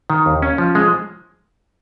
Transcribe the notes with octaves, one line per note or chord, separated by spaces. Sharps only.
D#3
D#2
C#4
F3
G#3